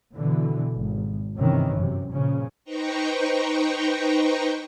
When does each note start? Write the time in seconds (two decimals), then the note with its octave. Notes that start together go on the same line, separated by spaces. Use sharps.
0.15 B2 D3 E3
0.76 G#1
1.37 G1 C3 D#3 E3 C#4
1.76 F#2 C3
2.12 A#2 C#3 F3 C#4
2.64 D#4 B4 C5 G5 A#5 C#6